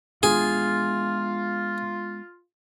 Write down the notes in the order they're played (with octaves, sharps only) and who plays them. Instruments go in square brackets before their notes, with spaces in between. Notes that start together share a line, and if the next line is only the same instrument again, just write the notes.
[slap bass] G#3 B3 D4 [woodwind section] F4 [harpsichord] G#4